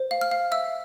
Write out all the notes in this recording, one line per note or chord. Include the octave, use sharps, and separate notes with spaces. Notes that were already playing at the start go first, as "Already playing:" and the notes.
Already playing: C5
F5
F6
F5
E5 E6